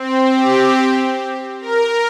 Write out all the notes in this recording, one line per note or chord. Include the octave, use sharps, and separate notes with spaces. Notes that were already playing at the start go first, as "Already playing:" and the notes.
Already playing: C4
G4
A#4